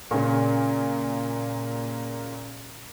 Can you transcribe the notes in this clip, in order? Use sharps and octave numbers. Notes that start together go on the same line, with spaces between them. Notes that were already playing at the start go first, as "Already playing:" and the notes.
A#2 C#3